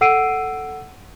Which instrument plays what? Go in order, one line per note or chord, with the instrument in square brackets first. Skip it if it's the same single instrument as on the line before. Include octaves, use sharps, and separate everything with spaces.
[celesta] A4 F#5 E6 C7 D7 D#7